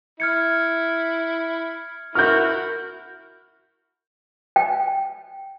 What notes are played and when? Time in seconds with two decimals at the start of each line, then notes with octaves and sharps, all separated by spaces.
0.20 E4 F6 G#6 C#7
2.15 E4 F#4 A#4 F6 G6
4.56 G5